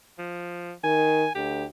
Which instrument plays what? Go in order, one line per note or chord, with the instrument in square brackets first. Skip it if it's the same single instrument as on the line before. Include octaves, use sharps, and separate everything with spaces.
[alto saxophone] F3
[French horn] D#3 [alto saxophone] G#5
[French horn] D2 [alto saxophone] G4